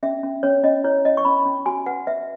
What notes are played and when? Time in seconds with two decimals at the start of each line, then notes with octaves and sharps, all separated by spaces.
0.03 C#4 E5
0.23 C#4
0.43 C#4 C#5
0.63 C#4 D#5
0.84 E4 C#5
1.05 C#4 D#5
1.17 C#6
1.25 C#4 B5
1.46 C#4
1.66 F#4 G#5
1.86 B4 F#5
2.07 B4 E5